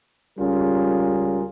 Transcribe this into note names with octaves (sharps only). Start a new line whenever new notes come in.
C#2 G3 C#4 F4 G#4 A#4